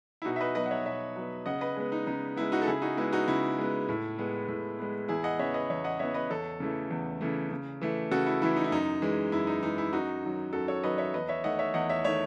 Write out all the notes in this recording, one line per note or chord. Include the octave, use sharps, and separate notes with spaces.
E4
B2 D#4 F#4
E5
B4 D#5
F#3 B3 B4 D#5
F#5
C#5 E5
B2 C#5 E5
F#3 B3
C#3 D#5 F#5
B4 D#5
G#3 B3
D#4
C#3 D#4
G#3 B3 E4
D#4 F#4
A4
C#3 E4 G#4
D#4 F#4
G#3 B3 E4
D#4 F#4
C#3 E4
G#3 B3
A2
G#3 B3
A2
G#3 B3
E2 E4 G#4
D#5 F#5
C#3 E3 B3 C#5 E5
B4 D#5
E2 C#5 E5
D#5 F#5
C#3 E3 B3 C#5 E5
B4 D#5
E2 A4 C#5
C#3 E3 A3
E2
C#3 E3 A3
C#3
E3 A3
C#3 F#4 A4
E4
E3 A3 E4
D#4
E4
F#2 D#4
E3 G#3
F#2 E4
D#4
E3 G#3 D#4
E4
F#2 D#4 F#4
D#3 F#3
F#2 F#4 A4
A4 C#5
D#3 F#3 B4 D#5
C#5 E5
E2 B4 D#5
C#5 E5
D#3 A3 D#5 F#5
C#5 E5
E2 D#5 F#5
C#5 E5
D#3 A3 C#5 E5